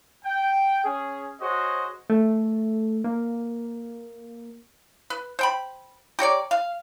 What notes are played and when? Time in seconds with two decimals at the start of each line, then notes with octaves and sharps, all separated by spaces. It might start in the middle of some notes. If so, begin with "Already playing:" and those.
0.25 G5
0.84 C#4 G#4
1.41 F#4 G#4 C5 C#5 D#5
2.10 A3
3.04 A#3
5.10 B4
5.39 C5 G5 B5
6.19 G4 A#4 C#5 D5
6.51 F5